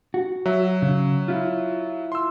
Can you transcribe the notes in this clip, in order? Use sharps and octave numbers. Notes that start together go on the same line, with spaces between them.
F#4
F#3 E5
C#3
E4 F4
C6 E6